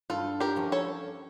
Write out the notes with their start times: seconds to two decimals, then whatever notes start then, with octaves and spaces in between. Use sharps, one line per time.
0.10 G2 F4 A4
0.40 G4 A#4
0.56 F3 C#4
0.72 A4 C#5